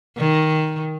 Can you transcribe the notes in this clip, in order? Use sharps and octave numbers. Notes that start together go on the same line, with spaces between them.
D#3